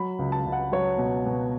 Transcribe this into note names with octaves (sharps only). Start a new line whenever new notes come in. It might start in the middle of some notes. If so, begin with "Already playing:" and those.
Already playing: F#3 B5
C#2
A5
C#2
F#5
F#3 C#5
B2
B2